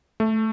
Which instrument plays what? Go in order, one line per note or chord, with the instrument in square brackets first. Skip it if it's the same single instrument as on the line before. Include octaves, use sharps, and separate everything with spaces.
[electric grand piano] A3